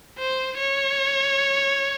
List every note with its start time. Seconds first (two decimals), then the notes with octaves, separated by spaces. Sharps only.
0.18 C5
0.57 C#5